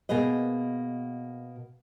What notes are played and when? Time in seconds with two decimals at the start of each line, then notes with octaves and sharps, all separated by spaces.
0.09 B2 A#3 G#4 B4 D#5